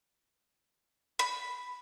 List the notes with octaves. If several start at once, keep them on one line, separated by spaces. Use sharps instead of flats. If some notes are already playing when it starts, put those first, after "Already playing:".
B5